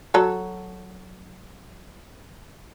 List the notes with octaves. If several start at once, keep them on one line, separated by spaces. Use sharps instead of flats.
F#3 A4